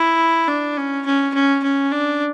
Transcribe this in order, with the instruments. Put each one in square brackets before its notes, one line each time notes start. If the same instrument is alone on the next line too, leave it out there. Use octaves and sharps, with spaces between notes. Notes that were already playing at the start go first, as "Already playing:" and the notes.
Already playing: [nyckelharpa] E4
D4
C#4
C#4
C#4
C#4
D4